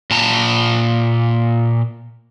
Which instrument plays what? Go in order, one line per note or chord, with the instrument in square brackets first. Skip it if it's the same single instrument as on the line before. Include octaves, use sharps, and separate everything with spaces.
[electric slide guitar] A#2 A5 A#5